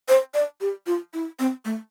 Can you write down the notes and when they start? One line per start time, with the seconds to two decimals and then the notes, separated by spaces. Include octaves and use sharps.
0.09 C5
0.34 D5
0.61 G4
0.87 F4
1.14 E4
1.39 C4
1.65 A3